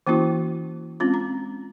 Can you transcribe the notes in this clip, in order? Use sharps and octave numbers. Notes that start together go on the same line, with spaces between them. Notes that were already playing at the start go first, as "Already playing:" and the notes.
E3 A#3 C#4 E4 F#4
G#3 C4 C#4 F4
A#5